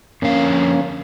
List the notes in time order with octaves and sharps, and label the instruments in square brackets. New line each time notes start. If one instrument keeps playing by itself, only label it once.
[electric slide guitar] F2 D3 F5 [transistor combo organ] A#3 C#4